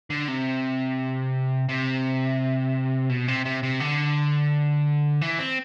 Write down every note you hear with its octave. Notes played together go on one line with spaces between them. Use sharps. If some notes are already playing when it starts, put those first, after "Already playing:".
D3
C3
C3
B2
C3
C3
C3
D3
E3
C4